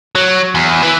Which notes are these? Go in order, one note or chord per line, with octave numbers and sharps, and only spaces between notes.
F#3
E2
E3